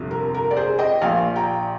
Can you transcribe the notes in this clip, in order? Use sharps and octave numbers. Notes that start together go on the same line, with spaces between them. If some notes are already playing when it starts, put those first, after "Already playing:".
Already playing: G1 F2 C3 F3
A#4
A#4
D5
G#4 C5
D#5 G5
A#1 A#2 F3 F5 G#5
G5 A#5